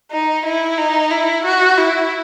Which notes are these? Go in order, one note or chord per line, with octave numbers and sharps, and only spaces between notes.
D#4
E4
D#4
E4
F#4
E4